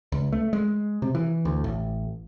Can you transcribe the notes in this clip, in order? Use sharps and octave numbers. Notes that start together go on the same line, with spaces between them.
C#2
A3
G#3
C3
E3
D2
A1